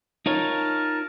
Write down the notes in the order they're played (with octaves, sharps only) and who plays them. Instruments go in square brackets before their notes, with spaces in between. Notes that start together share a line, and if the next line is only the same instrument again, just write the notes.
[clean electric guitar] D#4 F4 C#5 [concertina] A#4 A5